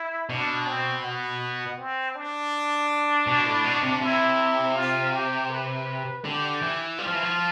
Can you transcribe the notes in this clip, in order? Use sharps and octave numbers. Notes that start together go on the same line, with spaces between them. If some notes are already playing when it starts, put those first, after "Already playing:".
Already playing: E4
B2 D4
C4
B3
C4
D4
B2
A2
B2
C3
C3 E4
F4
G4
B4
D3 G4
E3
G3 F4
F3
E3
F3